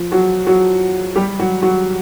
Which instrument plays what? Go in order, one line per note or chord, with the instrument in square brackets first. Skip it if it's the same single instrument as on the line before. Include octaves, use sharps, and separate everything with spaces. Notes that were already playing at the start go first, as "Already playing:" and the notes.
Already playing: [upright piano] F3
F#3 F#4
F#3 F#4
G3 G4
F#3 F#4
F#3 F#4